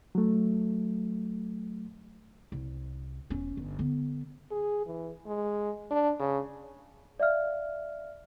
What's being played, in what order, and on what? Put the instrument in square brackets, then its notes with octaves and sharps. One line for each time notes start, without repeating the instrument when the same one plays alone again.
[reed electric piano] F#3 A3
[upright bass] C2
E1 C#4
G1
D3 B3
[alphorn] G#4
E3
G#3
D4
C#3
[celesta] D5 E5 F5 F6